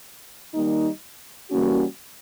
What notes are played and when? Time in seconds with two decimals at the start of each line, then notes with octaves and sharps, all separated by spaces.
0.54 D#3 G3 A#3 D#4
1.50 E3 G3 A#3 C#4 F#4